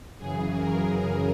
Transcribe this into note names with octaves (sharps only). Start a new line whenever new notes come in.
F#2 C#3 E3 G#4
A#4
A#4